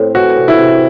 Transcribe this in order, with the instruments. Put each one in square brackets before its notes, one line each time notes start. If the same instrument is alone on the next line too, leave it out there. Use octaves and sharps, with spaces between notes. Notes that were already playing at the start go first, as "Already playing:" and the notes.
Already playing: [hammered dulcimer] A2 C4
[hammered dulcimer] E3 [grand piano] F#4
[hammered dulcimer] C3
[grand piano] E4
[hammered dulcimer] C3